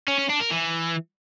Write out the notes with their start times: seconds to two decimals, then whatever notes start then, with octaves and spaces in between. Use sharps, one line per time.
0.08 C#4
0.19 C#4
0.29 D4
0.40 A#4
0.51 E3